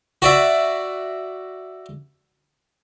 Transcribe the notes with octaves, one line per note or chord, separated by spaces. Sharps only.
F#4 D5 E5